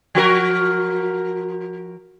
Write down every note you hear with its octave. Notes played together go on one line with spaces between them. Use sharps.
F3 F#4 A#4